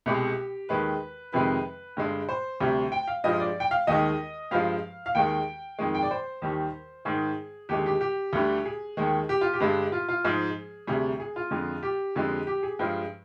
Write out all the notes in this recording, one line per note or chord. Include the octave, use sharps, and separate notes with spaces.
C2 B2 G#3 G4
D#2 D#3 G#3 B4
F2 C3 D#3 G#3 B4
G2 D3 G#3
C5
D2 C3 G3
G5
F5
G2 F3 G#3 D#5
D5
G5
F5
D#2 D#3 G#3 D#5
G2 F3 G#3 F5
F5
D#2 D#3 G#3 G5
F2 D#3 G#3
G5
D5
C5
D#2 D#3 G3
G#2 D#3 G#3 G#4
D#2 D3 G#3 G4
G4
G4
D2 D3 G3
G#4
D#2 D#3 G#3
G4
F4
G4
G2 D3 G#3
F4
F4
G#2 F3 G#3 G#4
D2 C3 G3 G#4
G#4
F4
F2 D3 G#3
G4
F2 D3 F3 G#3
G4
G#4
G2 F3 G#3